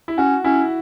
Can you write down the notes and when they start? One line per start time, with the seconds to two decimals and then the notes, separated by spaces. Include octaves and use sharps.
0.08 E4
0.18 C#4 F#4
0.44 C#4 E4